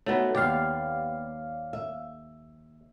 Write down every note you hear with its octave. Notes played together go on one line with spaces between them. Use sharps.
A3 B3 D#4 F#4 C5 C#5
D#2 B3 G4 D5 F5
E5